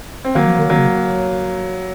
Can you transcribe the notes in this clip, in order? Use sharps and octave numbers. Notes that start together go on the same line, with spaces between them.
C4
D#3 F#3 A#3
F3
D#3
D#3 F#3 A#3
C#3